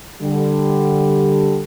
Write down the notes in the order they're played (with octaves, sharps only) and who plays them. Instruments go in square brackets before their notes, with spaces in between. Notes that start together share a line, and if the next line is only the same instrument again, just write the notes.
[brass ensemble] D3 G3